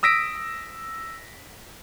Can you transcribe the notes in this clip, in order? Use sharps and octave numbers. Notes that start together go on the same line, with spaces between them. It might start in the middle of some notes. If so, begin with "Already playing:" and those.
D#6 E6 A#6 B6 D7